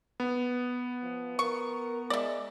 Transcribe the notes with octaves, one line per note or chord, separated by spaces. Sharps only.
B3
F3
A#4 C#6
G#3 D5 E5